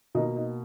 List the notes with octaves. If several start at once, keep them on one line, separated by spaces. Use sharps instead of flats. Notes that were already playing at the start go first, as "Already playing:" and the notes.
B2 A#3 D#4
D#4